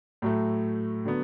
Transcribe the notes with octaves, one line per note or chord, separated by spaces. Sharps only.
A2 F#3 A3
D3 F#3 B3